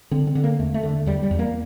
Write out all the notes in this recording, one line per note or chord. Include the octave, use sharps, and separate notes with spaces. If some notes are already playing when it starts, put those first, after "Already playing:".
D3 C4
C4
D3
A#3
E2 A3
A3
D3
E2 G3
G3
E2
A#3